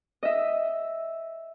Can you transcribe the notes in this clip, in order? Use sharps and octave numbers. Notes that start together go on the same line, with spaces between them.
D#5 E5